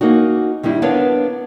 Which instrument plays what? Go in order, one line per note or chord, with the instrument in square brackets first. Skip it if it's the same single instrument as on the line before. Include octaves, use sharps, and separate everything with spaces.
[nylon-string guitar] A#3 C#4 D#4 F#4
D#3 G3 D4 E4
B3 D4 A#4 B4 C#5 F5